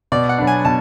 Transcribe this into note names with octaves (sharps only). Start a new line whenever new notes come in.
B2 D5
F#5
F#3 B3 D4
G#5
B2 A5